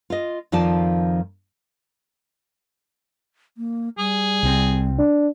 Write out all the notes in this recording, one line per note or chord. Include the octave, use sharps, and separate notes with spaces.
F4 D#5
F2 D#3 F3 F4 D5 A5
A#3
G3 G#4
C2 C4
D4